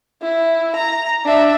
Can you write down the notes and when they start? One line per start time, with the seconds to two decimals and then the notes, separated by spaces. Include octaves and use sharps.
0.22 E4
0.76 A#5
1.26 D4 E5